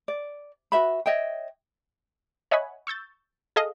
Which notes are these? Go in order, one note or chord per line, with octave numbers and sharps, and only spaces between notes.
D5
F#4 B4 E5 B5
C#5 D#5 E5 G5
C#5 D#5 E5 F#5 G#5 B5
C#6 E6 G6 A6
G#4 A4 D#5 F5